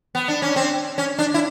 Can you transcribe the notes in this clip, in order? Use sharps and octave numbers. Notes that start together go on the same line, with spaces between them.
B3
D4
C#4
C4
C#4
D4
E4